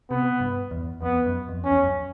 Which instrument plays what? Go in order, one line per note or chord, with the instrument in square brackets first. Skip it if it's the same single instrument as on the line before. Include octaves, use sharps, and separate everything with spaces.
[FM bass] C3 [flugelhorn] B3
[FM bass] G2
E2
[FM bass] F2 [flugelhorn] B3
[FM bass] F#2
F2
[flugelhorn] C#4
[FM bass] E2
F#2